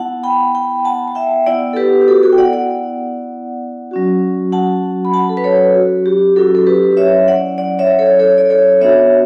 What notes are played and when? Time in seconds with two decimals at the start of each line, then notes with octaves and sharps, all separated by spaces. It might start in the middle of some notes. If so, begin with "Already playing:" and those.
Already playing: B3 E4 F#5 A5
0.23 G5 B5
0.55 G5 B5
0.85 F#5 A5
1.08 A5
1.15 E5 G5
1.46 B3 E4 D5 F#5
1.73 A4
1.76 G4 B4
2.01 G4
2.08 F#4 A4
2.23 F#4 A4
2.33 G5
2.38 D5 F#5
2.53 D5 F#5
3.91 F#3 C#4 F#4
4.52 F#5 A5
5.05 B5
5.14 F#5 A5
5.29 A4
5.37 B4
5.44 A4 C#5
5.75 F#4
6.06 G4
6.36 F#3 C#4 E4 F#4 A4
6.55 A4
6.67 G4 B4
6.97 C#5 E5
7.28 D5 F#5
7.58 D5 F#5
7.79 C#5 E5
7.99 A4 C#5
8.19 A4 C#5
8.38 D5
8.50 A4 C#5
8.81 B3 D4 F#4 C#5 E5